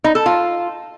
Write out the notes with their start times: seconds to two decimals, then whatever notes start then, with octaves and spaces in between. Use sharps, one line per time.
0.04 D#4
0.15 A4
0.26 F4